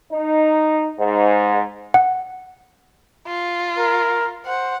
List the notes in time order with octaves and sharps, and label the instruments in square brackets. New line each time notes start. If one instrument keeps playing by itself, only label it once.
[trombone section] D#4
G#2
[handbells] F#5
[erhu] F4
[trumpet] A#4
[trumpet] C5 [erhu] F#5